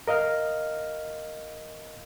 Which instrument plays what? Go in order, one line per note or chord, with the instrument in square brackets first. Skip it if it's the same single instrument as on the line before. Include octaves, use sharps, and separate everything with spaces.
[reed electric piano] A#4 D#5 F5 F6